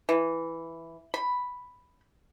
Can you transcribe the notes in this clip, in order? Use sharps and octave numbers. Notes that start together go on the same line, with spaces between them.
E3
B5